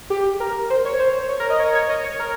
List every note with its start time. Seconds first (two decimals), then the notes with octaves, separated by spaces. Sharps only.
0.10 G4
0.40 A#4
0.70 C5
0.85 C#5
0.99 C5
1.29 C#5
1.40 A#4
1.50 D#5
1.59 C#5
1.75 C#5
1.89 D#5
2.04 C#5
2.19 A#4